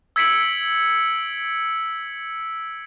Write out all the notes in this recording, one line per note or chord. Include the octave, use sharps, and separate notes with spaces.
E6 G#6 B6 C#7 D7 F#7